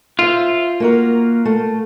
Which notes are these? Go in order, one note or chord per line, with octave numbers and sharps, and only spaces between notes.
F4 C5 E5
A#3 F#4 A#4
A3